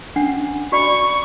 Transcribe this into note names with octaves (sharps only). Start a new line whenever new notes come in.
C#4 D4 F#5
F#4 D5 B5 C#6